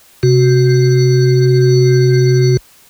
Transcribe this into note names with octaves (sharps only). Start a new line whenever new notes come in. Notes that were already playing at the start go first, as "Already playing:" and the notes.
C3 F#4